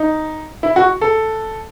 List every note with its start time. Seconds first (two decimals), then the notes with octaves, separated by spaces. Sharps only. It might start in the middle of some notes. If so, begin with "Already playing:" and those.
Already playing: D#4
0.63 E4
0.76 F#4
1.01 A4